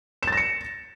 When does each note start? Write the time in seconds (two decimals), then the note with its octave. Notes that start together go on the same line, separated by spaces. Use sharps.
0.23 E7
0.27 A6
0.32 A#6
0.37 C#7